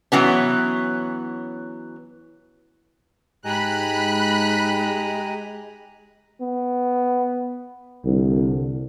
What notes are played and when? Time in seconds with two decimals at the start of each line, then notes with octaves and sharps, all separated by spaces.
0.12 E3 F#3 B3 C#4
3.45 G#2 G#3 G4 G#5 A#5 B5 F#6
6.41 B3
8.05 C2 D3